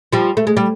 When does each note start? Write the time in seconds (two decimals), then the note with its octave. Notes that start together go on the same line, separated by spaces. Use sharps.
0.13 F3 G3
0.37 A3
0.47 G#3
0.57 G3